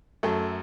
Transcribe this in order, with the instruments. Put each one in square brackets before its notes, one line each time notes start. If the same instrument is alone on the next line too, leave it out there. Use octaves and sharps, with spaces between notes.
[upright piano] F#2 F#3 A3 A4